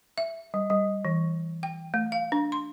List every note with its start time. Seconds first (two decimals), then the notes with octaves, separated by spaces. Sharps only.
0.18 E5
0.54 G3
0.70 G3
1.05 E3
1.63 G5
1.94 A3
2.12 F5
2.32 D4
2.52 C6